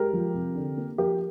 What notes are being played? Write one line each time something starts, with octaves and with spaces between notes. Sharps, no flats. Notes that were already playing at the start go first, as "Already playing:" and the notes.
Already playing: G#3 G4 A#4
F3
C3
D3
A#3
F3 G4 A#4